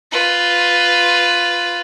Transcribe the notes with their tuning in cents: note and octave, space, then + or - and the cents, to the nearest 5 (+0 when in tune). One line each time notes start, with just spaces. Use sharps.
F4 +0 B4 +10